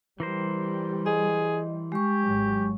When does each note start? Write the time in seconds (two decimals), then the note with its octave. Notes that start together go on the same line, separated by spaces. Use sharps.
0.20 E3 G3 A#4 C5
1.06 G#4 D#5
1.92 G#3 G4 C#6
2.22 G#1 F#3